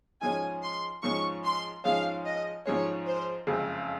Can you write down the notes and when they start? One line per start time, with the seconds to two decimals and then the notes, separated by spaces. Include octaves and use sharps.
0.21 G#2 F3 G#3 C#4 G#5
0.62 C6
1.02 G#2 F3 G#3 C#4 C#6
1.44 C6
1.84 G#2 F3 G#3 C#4 F5
2.25 D#5
2.66 G#2 F3 G#3 C#4 C#5
3.06 C5
3.47 F#1 F2 C#3 G#3 C4